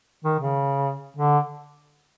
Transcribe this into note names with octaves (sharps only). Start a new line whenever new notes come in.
D#3
C#3
D3